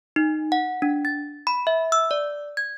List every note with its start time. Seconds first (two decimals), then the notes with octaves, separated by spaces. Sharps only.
0.16 D#4
0.52 F#5
0.82 D4
1.05 A6
1.47 B5
1.67 E5
1.92 E6
2.11 D5
2.57 G#6